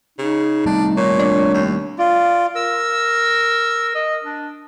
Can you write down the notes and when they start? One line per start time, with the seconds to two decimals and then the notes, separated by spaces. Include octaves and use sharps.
0.18 C#3 D#4
0.66 G3 A3 C4 D4
0.97 A#2 C#5
1.19 D4
1.54 D#2
1.99 F4 D5
2.56 A#4 E6
3.95 D#5
4.24 D4